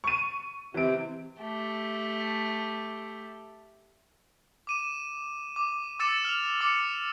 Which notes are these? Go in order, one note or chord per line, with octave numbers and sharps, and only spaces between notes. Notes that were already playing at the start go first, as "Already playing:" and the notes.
C#6 D#7
C3 E3 D7
A3 G4
D6 D#7 E7
D6
D6 E6 A6 C#7 E7
F6 F7
D6 C#7